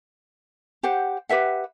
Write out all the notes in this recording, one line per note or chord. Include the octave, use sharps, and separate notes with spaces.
G4 C5 F#5
G4 B4 E5 F#5